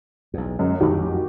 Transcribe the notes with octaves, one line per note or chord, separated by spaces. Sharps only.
B1 E2
F#2 G#3
A1 F2 D#3 F#3 F#4 G4